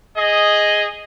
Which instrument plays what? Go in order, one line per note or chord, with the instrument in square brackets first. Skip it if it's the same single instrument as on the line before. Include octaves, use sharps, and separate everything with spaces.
[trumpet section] G#4 D#5